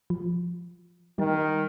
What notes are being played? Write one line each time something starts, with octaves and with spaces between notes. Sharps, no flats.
F3
D#3 G3 D#4